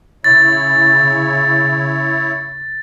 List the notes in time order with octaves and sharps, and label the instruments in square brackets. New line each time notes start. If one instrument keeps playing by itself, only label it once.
[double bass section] C#3 [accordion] E4 C#5 [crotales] A6